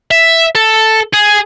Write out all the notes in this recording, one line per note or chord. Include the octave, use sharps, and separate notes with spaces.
E5
A4
G#4